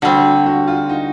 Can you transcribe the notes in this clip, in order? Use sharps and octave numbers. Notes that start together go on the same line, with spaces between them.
D3 G3 C4 F#4
F#4
F4
D#4